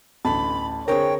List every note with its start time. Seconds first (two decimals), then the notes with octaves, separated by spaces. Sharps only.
0.25 A1 D2 A5 B5
0.88 D3 C4 G#4 A#4 C#5 G5